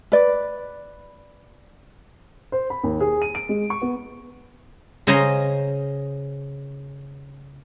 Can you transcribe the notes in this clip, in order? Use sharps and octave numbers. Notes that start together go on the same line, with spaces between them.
B4 D5
C5
B5
D#2
G#4
D#7
D7
G#3
C#6
B3
C#3 C5 D#5 G#5 A#5 C6